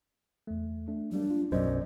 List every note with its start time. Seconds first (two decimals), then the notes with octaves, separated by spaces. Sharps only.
0.47 E2 A3
0.88 A3 D4
1.12 F#3 G3 A#3 D4
1.30 F4
1.52 B1 F#2 C5 D5 D#5